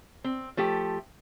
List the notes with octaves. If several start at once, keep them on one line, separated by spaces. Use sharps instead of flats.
C4
F3 A3 G4